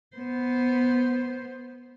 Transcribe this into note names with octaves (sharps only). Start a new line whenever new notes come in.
B3 C5